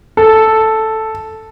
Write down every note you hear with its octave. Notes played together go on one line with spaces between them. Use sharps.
A4